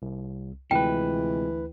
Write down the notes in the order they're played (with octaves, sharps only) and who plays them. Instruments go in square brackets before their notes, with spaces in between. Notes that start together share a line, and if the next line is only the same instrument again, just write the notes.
[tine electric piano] C2
[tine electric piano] D2 B4 [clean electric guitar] C3 F3 G#3 [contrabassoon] E3 [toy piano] G5